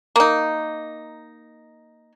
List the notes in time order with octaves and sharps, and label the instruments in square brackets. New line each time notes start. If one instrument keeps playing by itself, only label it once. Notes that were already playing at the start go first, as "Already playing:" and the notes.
[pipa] A#3 D#4